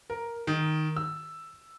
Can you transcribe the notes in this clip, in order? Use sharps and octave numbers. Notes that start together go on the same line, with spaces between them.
A#4
D#3
E6